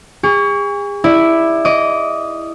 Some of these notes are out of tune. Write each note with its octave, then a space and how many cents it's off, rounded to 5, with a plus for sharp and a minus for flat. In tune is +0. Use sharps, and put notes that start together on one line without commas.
G#4 -40 C#6 +25
E4 +0 D5 +20 B5 +0
D#5 +0 D6 -25